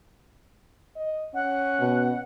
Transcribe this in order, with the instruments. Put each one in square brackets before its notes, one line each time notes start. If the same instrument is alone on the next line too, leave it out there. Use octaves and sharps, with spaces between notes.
[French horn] D#5
[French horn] C#4 [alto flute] F#5
[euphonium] B2